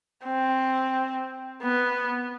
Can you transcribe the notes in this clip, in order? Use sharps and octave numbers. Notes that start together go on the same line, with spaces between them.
C4
B3